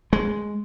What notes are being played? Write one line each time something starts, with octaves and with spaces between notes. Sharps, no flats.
G#3